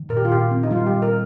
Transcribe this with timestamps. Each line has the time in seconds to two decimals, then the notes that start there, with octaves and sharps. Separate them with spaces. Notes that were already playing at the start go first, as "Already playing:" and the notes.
Already playing: D#3
0.09 A#2 A#4
0.17 G4
0.25 F4
0.30 A#2 G4
0.51 C4
0.63 D#4
0.71 G3 F4
0.86 G4
0.92 A#2
1.02 A#4